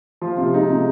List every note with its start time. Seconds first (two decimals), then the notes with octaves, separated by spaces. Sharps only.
0.21 F3 F4
0.37 C3 F4
0.54 G#3 D#4
0.70 C3